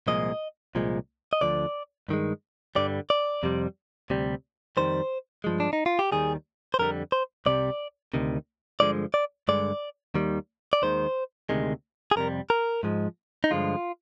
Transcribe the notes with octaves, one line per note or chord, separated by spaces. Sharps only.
C2 A#2 F3 G#3 D#5
C2 A#2 F3 G#3
D#5
D2 D3 F3 D5
G2 D#3 G#3
G2 D3 G3 D5
D5
F2 C3 G3
D2 C3 G3
F2 D#3 G3 C5
G2 F3 G#3
D4
D#4
F4
G4
D#2 D#3 G3 G#4
C5
F2 D3 G3 A#4
C5
C2 C3 G3 D5
D2 C3 D#3
G2 D3 F3 G#3 D5
D5
G2 D3 G#3 D5
D#2 D#3 G3
D5
D#2 D#3 G#3 C5
D2 C3 D#3 G#3
G#4
F2 C3 G3 A#4
A#4
G#2 F3 G#3
D#4
G2 D3 F3 G#3 F4